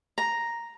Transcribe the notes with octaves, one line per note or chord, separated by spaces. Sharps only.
A#5